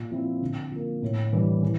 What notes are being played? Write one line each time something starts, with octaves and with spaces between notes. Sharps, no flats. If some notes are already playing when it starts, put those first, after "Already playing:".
Already playing: A#2
F3 C4 E4
D3
F3 A#3
A2
E3 G3 D4
E3